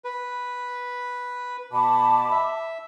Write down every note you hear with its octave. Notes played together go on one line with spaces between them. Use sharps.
B4
B2 A5 B5 D6
E5